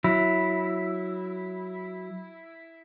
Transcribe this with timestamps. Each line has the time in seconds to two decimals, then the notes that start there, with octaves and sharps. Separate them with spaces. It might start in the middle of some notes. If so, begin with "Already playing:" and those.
0.04 F#3 E4